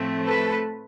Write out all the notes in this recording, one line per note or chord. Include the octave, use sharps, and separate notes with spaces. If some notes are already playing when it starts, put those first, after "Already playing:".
Already playing: A2 F3 A3 C4
A4 B4